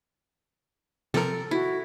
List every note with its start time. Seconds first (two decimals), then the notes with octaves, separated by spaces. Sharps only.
1.14 C3 F3 A4 A#4
1.51 E4 F#4